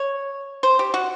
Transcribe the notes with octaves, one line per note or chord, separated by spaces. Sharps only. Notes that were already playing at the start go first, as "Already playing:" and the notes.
Already playing: C#5
C5
G4
F#4